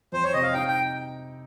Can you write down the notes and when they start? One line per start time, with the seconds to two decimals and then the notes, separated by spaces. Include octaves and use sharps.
0.12 F2 C5
0.24 C#5
0.33 C3 D#5
0.43 F5
0.54 D#4 G5
0.68 G5